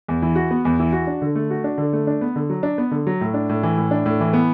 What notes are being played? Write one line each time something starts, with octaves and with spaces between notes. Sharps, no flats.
E2
E3
F#4
B3
E2
E3
F#4
D4
D3
A3
F#4
D4
D3
A3
D4
B3
D3
F#3
D4
B3
D3
F#3
A2
D4
A2
E3
A2
D4
A2
E3
B3